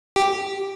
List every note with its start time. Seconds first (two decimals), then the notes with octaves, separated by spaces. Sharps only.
0.16 G4